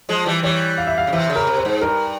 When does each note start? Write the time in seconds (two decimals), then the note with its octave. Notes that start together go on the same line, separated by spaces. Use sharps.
0.09 F3 G#3
0.26 E3 G3
0.43 E3 G3 C#5
0.78 F5
0.87 E5
0.98 F5
1.07 C#3
1.13 C3 E3 E5
1.30 C#3
1.36 A#4
1.47 C3
1.58 C5
1.65 G#2
1.81 G2 A#4